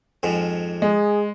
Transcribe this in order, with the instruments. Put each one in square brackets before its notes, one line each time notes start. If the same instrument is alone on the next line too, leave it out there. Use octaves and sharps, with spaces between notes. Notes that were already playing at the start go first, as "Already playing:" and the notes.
[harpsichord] F2 G#2 F3
[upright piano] G#3 [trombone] G#4